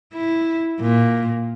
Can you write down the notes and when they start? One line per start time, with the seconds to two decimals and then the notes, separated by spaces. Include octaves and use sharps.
0.13 E4
0.81 A#2